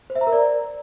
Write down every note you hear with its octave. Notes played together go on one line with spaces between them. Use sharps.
C5
E5
A#5
A#4
D5